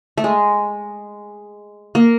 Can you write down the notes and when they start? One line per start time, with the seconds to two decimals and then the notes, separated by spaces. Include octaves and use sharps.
0.18 A3
0.24 G#3
1.95 A#3